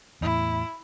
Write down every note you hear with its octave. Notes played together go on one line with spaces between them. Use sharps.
E2 A2 E4